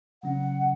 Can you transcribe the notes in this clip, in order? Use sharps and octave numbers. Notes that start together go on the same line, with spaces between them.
C#3 F#3 C#4 F#5